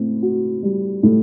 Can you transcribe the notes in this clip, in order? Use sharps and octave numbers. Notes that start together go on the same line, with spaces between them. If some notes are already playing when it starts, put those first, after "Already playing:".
Already playing: A2 C4
F#4
G3
A2